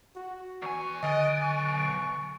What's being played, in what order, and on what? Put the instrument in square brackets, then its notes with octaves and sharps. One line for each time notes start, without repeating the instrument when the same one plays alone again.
[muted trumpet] F#4
[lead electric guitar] E2 G#5 [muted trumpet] C#6
[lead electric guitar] B1 G#5 [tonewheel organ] D3 [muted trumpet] D#5
[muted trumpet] C#6